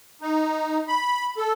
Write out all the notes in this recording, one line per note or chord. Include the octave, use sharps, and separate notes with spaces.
D#4
B5
A4